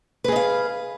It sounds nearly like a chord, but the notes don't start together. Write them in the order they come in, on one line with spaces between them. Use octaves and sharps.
B4 G#4 D#5 F5